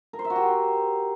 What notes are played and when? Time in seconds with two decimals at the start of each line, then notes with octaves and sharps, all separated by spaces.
0.13 A#4
0.19 C5
0.25 E5
0.30 F#4
0.36 G4